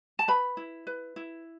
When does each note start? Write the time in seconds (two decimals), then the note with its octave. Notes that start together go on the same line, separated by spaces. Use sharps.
0.19 A5
0.28 B4 B5
0.57 E4
0.87 B4
1.16 E4